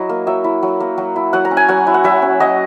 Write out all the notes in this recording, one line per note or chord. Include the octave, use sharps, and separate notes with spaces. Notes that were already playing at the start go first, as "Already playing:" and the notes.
Already playing: F#3 E4 D#5
A#3
F#3 E5
E4
F#3
A#3
F#3
E4
F#3 F#5
A#5
C#4
G#5
F#3 F#5
E4
F#5
F#3 E5
C#4
F#3 D#5